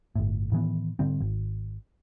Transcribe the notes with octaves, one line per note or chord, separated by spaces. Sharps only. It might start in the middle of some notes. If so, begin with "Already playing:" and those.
G1 A2
A2 D#3 E3 B3
G#2 D3 G3 C4
G#1